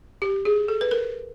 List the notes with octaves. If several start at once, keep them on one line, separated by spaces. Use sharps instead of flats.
G4
G#4
A4
B4
A#4